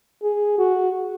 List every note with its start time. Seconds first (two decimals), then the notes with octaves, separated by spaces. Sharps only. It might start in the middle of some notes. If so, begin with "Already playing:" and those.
0.23 G#4
0.58 F#4